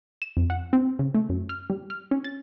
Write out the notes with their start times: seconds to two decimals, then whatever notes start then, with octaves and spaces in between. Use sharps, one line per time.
0.22 E7
0.37 F2
0.50 F#5
0.73 C4
0.99 C#3
1.15 A3
1.29 F#2
1.49 F6
1.70 G3
1.90 F6
2.11 C#4
2.24 A6